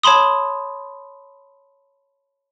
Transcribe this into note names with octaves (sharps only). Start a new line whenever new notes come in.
C#5 A5 B5 C6 D#6